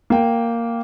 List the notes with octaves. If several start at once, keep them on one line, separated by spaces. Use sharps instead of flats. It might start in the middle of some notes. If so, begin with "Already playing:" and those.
A#3 G5